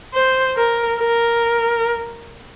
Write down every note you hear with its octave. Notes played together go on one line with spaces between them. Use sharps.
C5
A#4
A#4